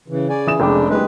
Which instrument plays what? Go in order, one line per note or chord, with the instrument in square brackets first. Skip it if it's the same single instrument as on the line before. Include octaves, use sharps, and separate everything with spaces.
[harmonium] C#3 E3
[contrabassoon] C#3 [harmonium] D5 G#5
[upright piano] E3 D#6 E7
[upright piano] F1 G5 D6 [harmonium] G#3 D4
[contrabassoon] F#1 [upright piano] G#3 D4 G4 [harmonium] B4